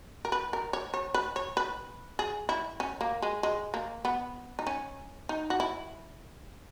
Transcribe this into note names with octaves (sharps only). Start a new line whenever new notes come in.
A#4
B4
A#4
C#5
C#5
B4
C#5
B4
G#4
E4
C#4
A#3
G#3
G#3
A#3
B3
D#4
C#4
D#4
F#4
E4